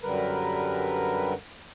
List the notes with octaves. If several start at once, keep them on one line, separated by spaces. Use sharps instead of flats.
F#2 D3 G3 A#4 B4